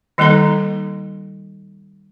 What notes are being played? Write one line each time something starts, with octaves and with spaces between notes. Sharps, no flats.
D#3 G3 A#3 D#4 A4 A#5